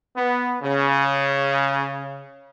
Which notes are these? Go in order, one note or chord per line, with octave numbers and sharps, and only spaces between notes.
B3
C#3